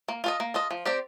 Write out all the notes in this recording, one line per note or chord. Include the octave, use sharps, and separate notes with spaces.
A#3
F4 A4 D#5
A#3
F4 A4 D#5
F3
C4 G4 D5